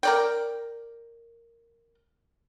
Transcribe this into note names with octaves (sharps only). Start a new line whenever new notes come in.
A#4 D5 G5